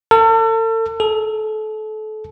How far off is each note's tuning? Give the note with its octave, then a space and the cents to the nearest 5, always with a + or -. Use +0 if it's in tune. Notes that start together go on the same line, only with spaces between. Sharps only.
A4 +40
A4 -30